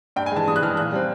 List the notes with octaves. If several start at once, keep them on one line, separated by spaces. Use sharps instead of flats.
G2 G5
G#5
E3 G#3 A5
G2 D#6
F#6
E3 G#3 F6
A#2 F#6
G3 C4